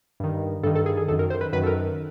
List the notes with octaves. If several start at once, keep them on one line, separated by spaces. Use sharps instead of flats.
G2 D#3
G2 D#3 A4
A4
G#4
G#4
F#2 D#3 A4
A#4
C5
B4
F#2 D#3 B4
A4
A#4